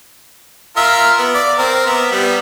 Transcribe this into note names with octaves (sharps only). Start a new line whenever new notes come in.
F4 A#4 E5
B3
D5
C4 A#4
B3 E5
G3 B3